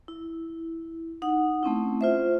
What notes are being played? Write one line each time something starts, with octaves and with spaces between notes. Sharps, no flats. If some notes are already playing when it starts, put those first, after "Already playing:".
E4
D#4 F#5
A3 C4 C#4 E4
F4 C5 E5